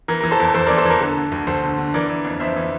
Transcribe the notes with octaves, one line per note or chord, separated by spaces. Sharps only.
E3 A#4
E3 A#4
A4 C5
E2
E2 A4 C5
A#4 D5
E3
A4 C5
E3 A#4
D3 A4
D3
D2
D2 A4 C5
D3
D3
E3 A#4 D5
E3
F2
F2 C5 E5
E3